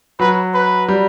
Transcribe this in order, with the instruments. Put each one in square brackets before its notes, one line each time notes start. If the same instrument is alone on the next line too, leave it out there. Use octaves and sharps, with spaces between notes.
[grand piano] F#3 [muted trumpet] B4
[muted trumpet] B4
[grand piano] G3